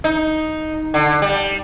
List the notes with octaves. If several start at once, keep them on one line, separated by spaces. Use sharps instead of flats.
D#4
D3
G3